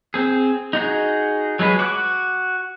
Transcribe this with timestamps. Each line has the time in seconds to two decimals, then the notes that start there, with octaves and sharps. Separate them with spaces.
0.14 C4 G#4
0.73 D#4 F#4 G#4
1.59 F#3 G#3 G#4 B4
1.79 F#4 D6 F#6